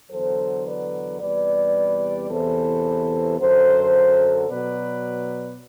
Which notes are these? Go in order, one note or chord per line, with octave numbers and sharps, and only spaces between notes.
E2 D3 F#3 A4 C5
B4 D5
E2 C3 G3 B4 D5
E2 C3 E3 A4 C5
F#2 D3 F#3 A4 C5
B2 F#3 B4 D5